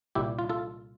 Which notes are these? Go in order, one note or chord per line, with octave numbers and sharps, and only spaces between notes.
C2 A#2 G3 E4 G4
F4
F4 A4